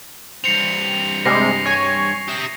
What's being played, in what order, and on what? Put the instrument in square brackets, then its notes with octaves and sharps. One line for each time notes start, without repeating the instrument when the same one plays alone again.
[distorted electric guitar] G2 C4 [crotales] C#7 F7
[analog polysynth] C3 G3 G#3 [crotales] A#6 C7
[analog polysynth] C#5 G#5
[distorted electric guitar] G4 E5 [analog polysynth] D#6 E7